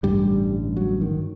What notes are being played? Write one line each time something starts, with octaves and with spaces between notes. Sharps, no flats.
A1 G2 D3 G3
F#3
D#3